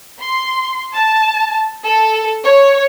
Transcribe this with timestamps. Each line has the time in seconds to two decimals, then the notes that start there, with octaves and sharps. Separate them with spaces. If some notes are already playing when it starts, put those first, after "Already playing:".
0.21 C6
0.94 A5
1.86 A4
2.44 C#5